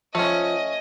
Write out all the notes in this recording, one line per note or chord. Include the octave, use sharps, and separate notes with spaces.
F3 A3 C#4 D#5